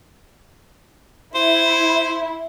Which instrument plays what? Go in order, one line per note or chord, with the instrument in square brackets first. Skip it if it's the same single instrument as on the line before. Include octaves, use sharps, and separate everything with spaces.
[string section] E4 [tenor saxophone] C5